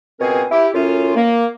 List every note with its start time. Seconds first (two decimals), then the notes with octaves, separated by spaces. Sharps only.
0.20 C#2 B2 C4 G#4 A#4 G#5
0.51 E4 G4
0.74 F#2 A2 C#4 F4
1.15 A#3